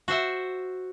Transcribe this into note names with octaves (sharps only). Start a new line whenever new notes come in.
F#4 C5 E5 F#5